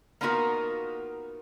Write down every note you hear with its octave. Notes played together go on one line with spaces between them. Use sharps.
A#3 B3 D#4 F4 F#4 A#4